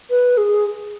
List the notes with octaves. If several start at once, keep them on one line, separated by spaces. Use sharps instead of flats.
B4
G#4